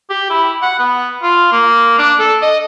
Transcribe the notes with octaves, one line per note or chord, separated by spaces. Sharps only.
G4
E4
F#5
B3
F4
A#3
D4
A4
D#5